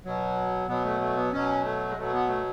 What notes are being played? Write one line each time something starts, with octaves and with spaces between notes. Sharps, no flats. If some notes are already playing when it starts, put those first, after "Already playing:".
B2 F#3
B2 F#3 B3
A3
A3
B3
B2 F#3 C#4
A3
G#3
B2 F#3 A3
B3
A3